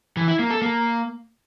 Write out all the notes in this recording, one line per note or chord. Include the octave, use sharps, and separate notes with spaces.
E3
E4
A#3
A4
A#3